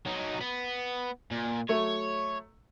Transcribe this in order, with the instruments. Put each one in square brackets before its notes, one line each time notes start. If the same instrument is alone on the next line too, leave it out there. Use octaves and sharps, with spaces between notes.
[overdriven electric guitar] F#3 D#4
B3
A#2
[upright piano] F#3 A3 [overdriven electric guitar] C#5